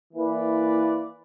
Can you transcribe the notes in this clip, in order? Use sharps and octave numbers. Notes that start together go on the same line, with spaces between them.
E3 A#3 E4 B4 D5